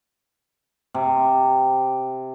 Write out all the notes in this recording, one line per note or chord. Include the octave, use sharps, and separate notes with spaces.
C3